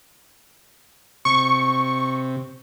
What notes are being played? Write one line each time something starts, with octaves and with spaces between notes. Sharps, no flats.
C3 C#6